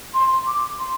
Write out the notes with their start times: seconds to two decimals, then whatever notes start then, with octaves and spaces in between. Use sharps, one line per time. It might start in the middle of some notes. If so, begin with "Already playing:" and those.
0.14 C6
0.47 D6
0.79 C6